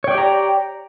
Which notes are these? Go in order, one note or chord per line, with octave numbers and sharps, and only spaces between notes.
G4 C#5 D5 G5 A#5